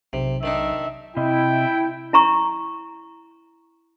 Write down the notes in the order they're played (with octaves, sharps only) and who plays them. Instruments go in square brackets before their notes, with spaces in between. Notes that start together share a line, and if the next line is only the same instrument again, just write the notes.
[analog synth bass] B1 [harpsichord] C3
[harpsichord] D#3 D4 D#4 [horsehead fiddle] E5
[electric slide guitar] C3 D#5 [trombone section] E4 [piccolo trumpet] G5
[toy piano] E4 A#5 C#6